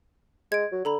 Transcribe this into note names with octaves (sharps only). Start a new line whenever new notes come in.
G#3 G#6 D7
F#3
D3 A4 A#5 B5